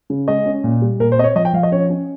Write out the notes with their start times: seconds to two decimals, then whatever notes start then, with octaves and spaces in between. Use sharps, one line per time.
0.10 C#3
0.28 G#3 D#5
0.46 C#4
0.64 A#2
0.82 G3
1.00 A#2 A#4
1.12 C5
1.17 C4 D#5
1.24 C#5
1.35 F3 D#5
1.45 G5
1.53 F3 F5
1.63 D#5
1.71 C#4 C#5
1.90 C#4